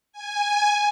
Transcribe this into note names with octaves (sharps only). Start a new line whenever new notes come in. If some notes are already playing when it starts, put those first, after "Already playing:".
G#5